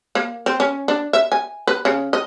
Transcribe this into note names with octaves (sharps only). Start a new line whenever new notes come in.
A#3
C4
C#4
D4
E5
G#5
B4
C#3
D#5